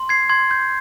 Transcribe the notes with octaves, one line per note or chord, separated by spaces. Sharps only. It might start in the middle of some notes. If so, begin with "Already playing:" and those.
Already playing: C6
G#6 C7
C6 G#6
G6